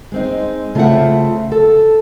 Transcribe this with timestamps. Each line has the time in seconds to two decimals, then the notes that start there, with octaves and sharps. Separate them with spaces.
0.12 G#3 C4 D#4
0.75 C#3 A3 C4 F4 E5 F#5
1.52 A4